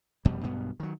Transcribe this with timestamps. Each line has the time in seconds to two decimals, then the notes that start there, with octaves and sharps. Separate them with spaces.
0.25 F1 F2 B2 G3
0.44 B1 G2 B2 B3
0.80 D#3 F#3